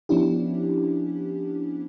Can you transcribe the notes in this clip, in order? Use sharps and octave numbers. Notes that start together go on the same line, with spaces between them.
F3 B3 C#4 D4 E4 G4